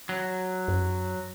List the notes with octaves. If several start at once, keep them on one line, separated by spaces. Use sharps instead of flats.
F#3
F#2